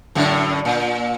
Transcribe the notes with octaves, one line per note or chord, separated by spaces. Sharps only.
F#2 A2 D3
A#2